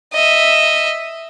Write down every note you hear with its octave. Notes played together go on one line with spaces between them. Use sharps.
D#5 E5